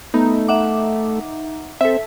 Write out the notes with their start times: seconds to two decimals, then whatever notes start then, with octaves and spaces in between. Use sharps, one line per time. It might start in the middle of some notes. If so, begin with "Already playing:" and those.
0.14 A3 B3 D#4
0.48 E5 F#5 D6
1.81 C4 A4 E5